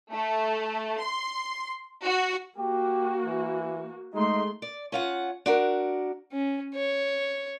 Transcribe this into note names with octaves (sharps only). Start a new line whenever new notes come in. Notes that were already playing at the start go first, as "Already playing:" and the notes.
A3
C6
F#4
A#3 F#4 G4
E3
G#3 A3 D#4 C6
D5
C#4 F4 F#5
D4 F#4 A#4
C#4
C#5